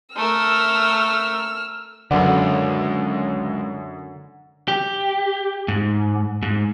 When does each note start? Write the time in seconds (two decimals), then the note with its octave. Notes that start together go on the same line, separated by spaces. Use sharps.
0.16 A3 A#4 E6 F6
2.11 C#2 F#2 D3 B4 D5 F#5
4.68 G4
5.68 G#2
6.43 G#2